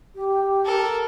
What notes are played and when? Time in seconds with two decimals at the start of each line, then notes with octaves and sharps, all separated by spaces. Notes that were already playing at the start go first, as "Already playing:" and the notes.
0.15 G4
0.65 A4 A#4